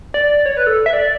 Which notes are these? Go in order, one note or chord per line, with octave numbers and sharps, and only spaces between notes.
D5
C#5
B4
A4
E5
D5